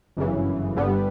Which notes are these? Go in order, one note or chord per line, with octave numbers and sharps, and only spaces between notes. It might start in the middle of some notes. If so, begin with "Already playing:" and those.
G1 F#2 C#3 E3
G1 G2 D3 G3 B3